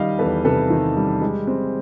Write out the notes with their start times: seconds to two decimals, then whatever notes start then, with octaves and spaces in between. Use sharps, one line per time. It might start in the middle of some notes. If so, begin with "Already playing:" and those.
Already playing: D#3 G3 D#5 F5
0.19 E2 A4 B4
0.45 C3 A4 B4
0.70 D#3
0.96 G3
1.22 G#3
1.47 C4